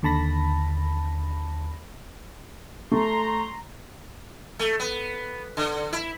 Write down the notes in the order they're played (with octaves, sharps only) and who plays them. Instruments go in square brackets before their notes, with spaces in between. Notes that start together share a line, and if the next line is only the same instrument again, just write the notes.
[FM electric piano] D#2 D3 A5 B5 A#6
[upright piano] A3 [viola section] A#5 C6
[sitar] A3
B3
D3
E4